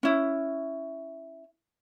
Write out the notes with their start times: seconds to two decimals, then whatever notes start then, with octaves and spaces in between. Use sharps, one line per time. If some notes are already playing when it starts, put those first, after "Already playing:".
0.03 C#4 E4